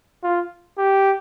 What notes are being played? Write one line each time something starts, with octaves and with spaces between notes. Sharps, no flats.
F4
G4